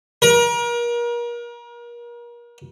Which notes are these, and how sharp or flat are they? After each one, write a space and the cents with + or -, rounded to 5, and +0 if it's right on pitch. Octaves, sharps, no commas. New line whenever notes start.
A#4 +35